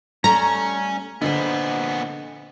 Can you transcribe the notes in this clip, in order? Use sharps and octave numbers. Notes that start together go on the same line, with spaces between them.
G3 A3 C#4 A#5
A#2 D3 B3 C5 D#5